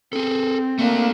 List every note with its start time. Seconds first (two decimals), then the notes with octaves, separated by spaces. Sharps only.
0.13 C4 G#4 A4
0.79 A3 A#3 D4